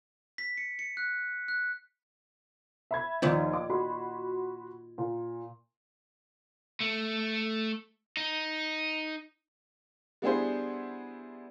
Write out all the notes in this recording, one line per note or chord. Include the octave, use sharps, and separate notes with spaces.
B6
C#7
C#7
F#6
F#6
E5 B5 G#6
D#2 A#2 D#3 F3
D6
F#4 B5 C6
A#2
A3
D#4
G3 B3 D4 E4 G#4 C5